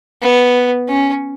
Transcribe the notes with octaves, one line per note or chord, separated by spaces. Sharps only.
B3
C#4